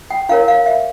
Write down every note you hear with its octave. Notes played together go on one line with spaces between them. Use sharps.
G5
E4 A#4 C#5 F5
F5
E5